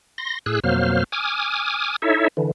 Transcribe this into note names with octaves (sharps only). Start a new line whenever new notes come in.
C6 A#6
A2 G#4 E6 F#6
F2 B2 F#3 A#3 C5 F6
G#5 D6 D#6 F6
D#4 E4 A4 C#5 E5
D3 E3